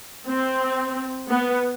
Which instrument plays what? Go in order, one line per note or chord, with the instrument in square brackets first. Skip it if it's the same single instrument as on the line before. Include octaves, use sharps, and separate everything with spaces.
[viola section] C4
B3